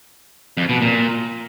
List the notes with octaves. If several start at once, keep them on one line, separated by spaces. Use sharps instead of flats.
F2
B2
A#2